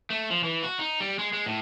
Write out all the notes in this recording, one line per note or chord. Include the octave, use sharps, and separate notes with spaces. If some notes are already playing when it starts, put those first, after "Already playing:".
A3
F3
E3
F#4
D#4
G3
G#3
G#3
A2